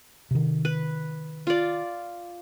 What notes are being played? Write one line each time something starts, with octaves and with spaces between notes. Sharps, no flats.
C3 D#3
B4
F4 D5